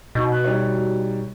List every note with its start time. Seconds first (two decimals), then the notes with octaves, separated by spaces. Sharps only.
0.15 B2 D#4
0.32 F#6
0.44 G3 D#4 C#5